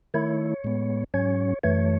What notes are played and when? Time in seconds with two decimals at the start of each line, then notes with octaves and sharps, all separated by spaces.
0.14 D#3 A3 E4 C#5
0.64 A2 G#3 B3
1.14 G#2 F#3 C#4 C#5
1.63 F#2 E3 A3 C#5